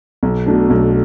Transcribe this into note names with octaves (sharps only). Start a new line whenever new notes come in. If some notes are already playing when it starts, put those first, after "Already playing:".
B1
B2 A3 D4
B1